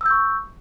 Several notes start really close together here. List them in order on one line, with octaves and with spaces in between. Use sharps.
E6 G6 C#6